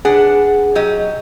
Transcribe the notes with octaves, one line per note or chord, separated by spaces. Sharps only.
D4 G#4 B4 F#5
F#3 G4 D#5